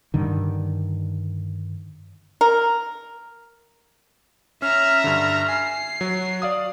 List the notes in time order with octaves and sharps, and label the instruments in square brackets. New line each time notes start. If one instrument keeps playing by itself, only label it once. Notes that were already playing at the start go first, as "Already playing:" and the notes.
[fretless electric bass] G2 D3 D#3
[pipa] A#4
[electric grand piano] C#4 [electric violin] E5 A#5 [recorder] F6
[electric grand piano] G2 D3
[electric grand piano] G#5 [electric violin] C7
[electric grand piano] F#3 [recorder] F#4
[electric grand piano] D5 F5 D#6